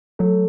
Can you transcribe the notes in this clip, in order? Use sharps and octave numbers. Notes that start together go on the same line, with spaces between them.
F#3 A3